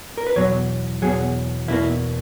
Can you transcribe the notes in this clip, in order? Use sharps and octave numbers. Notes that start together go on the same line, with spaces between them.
A#4
B4
E2 B2 F#3 C#5
E2 B2 F#3 G#4
E2 B2 A#3 E4